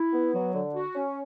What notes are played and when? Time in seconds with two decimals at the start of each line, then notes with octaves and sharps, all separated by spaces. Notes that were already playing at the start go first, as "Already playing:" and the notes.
Already playing: E4
0.13 B3
0.34 F#3
0.54 D3
0.74 F#4
0.95 C#4